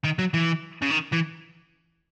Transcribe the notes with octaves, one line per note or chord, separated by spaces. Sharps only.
D#3
F#3
E3
C#3
D#3
E3